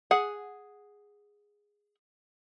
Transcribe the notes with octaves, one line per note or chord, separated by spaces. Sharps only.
G#4 F#5